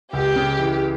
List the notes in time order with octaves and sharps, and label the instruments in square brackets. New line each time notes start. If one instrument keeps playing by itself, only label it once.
[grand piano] C#2 [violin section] G4
[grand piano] C#3
E3